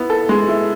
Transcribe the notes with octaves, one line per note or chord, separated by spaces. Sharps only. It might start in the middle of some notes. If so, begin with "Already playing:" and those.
Already playing: B3 E4
A4
G#3
E4